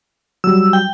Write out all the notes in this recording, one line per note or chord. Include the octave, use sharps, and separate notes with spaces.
F#3 G3 E6
G5